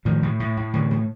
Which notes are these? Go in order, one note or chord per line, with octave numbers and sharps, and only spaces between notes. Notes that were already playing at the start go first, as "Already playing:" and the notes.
A2 D#3 F3
A2
A2
A2
A2 D3 E3
A2